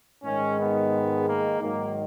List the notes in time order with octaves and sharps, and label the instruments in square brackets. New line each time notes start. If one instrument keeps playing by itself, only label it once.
[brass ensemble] G#2 D#3 G#3 C#4
B3
A#3
G#2 D#3 F#3 A#3